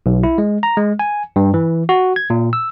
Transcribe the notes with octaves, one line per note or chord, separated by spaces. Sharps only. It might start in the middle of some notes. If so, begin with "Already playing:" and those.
B1
E4
G#3
A#5
G#3
G#5
G2
E3
F#4
G#6
A#2
E6